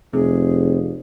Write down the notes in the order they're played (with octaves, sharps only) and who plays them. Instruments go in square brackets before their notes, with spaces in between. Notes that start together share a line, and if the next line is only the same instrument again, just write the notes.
[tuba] F1 [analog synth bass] C3 [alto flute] G#4